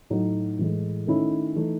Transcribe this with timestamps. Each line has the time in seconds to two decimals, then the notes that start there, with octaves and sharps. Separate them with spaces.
0.10 A2 F#3 A3 D#4
0.59 A2 E3 G#3
1.07 D#3 A3 C#4 E4
1.56 E3 A3 D#4